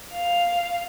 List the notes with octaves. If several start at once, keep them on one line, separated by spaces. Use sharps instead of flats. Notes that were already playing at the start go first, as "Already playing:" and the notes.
F5